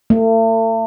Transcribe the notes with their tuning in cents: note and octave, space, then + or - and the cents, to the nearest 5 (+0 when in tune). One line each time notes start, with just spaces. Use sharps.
A3 +40